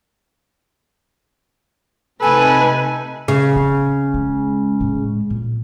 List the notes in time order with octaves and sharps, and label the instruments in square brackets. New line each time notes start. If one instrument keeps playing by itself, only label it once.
[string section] C3 A3 D#4 [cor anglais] A4 [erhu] B4 [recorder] G#5
[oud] C#3
[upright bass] C4
G#3
A2 G#3
A#2